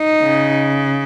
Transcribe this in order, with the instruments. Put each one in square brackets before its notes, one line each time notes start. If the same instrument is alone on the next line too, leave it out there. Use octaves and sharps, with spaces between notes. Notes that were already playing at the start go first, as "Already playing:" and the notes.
Already playing: [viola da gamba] D#4
[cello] C#3